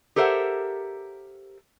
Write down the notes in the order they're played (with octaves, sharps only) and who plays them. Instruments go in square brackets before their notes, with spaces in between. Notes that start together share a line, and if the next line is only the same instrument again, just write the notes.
[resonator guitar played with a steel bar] G4 A4 A#4 C5 E5 F#5